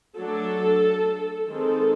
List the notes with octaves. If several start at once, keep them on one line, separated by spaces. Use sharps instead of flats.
F#3 A3 D4 A4
D#3 G#3 C4 A4